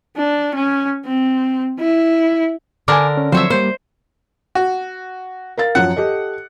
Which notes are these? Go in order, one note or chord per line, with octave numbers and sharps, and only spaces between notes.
D4
C#4
C4
E4
D3 D4 A#4 G#5 D6
C#4
F3 F#3 C4 C5 C#5 E5
G3 A#3 C5
F#4
A#4 F5 A6
F#2 F3 F#3 F#5
G4 A4 D#5